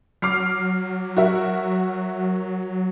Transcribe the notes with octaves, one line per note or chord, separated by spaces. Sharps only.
F#3 D6 F6 C7
F#4 A#4 E5